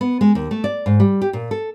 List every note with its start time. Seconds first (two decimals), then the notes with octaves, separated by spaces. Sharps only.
0.01 B3
0.21 G#3
0.35 D#2
0.51 A3
0.64 D5
0.86 G#2
1.00 G3
1.21 G4
1.33 A#2
1.51 A4